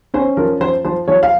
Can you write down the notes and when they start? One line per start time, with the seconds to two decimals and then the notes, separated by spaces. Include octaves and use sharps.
0.14 C#4 C5
0.37 F3 A#4
0.60 F3 C5
0.85 F3 C5
1.08 F3 C#5
1.23 F5